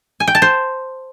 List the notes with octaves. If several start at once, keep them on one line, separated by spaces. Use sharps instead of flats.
G#5
G5
A5
C5